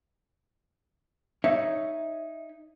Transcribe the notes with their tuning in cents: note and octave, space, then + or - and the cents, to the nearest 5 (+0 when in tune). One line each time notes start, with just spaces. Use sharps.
D#4 +0 C#5 +0 E5 +0